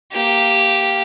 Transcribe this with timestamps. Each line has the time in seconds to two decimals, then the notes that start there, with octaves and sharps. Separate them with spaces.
0.13 A#3 G4